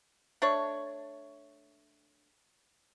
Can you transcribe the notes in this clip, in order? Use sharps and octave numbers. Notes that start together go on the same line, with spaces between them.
A3 D4 C#5